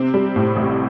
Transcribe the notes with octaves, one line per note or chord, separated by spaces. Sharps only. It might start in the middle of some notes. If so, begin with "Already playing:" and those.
Already playing: C3 C4
G3
A2
A1